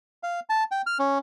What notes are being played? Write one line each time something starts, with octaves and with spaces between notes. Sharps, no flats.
F5
A5
G5
F6
C#4